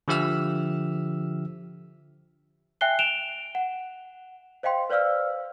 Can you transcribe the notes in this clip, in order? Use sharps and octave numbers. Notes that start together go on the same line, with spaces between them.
D3 F3 G4 E5 E6 F6
E5 G5 G#5 F#6 C7 G7
D7 E7 F7 G7
F#5
C5 D#5 F5 G5 C6
B4 C5 D5 F5 E6 F6